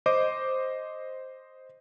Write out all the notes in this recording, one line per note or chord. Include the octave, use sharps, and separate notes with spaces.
C5 D#5 D6